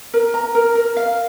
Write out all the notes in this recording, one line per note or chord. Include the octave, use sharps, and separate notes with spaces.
A#4
A#5
A#4
A#4
F5